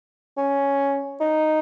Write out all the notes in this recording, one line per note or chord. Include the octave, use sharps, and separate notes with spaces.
C#4
D#4